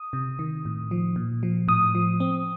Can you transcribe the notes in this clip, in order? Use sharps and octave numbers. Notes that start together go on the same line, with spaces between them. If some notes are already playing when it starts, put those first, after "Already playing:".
Already playing: D#6
C3
D#3
A2
F3
A#2
F3
A2 D#6
F3
C4